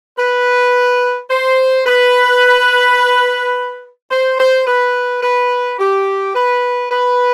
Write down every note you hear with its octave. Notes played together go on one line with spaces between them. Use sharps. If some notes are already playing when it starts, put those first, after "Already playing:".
B4
C5
B4
C5
C5
B4
B4
G4
B4
B4